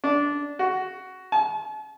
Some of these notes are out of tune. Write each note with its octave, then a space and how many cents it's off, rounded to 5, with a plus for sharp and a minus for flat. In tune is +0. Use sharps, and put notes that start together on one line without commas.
D4 -15
F#4 +10
A5 -45